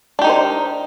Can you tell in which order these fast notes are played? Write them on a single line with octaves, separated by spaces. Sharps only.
D4 G4 D#4 A#4 C5